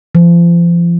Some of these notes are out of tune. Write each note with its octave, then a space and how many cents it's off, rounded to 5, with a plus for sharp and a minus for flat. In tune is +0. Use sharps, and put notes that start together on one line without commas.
F3 -35